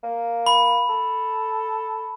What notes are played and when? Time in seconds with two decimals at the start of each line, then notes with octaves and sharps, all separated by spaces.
0.03 A#3
0.46 B5
0.89 A4